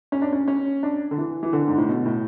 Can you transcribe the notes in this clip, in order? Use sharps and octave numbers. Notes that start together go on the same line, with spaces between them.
C#4
D4
C#4
C#4
D4
D3
E3
E3
D3
G#2
A2
B2
A2